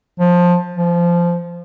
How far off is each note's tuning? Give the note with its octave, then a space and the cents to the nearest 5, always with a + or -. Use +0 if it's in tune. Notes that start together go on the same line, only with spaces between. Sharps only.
F3 +15
F3 -15